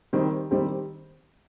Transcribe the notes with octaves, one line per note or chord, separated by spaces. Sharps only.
D#3 G3 C4 G4
D#3 G3 C4 G4